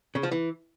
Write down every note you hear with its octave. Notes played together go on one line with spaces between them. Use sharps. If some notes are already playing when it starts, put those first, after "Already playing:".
C#3
F3
E3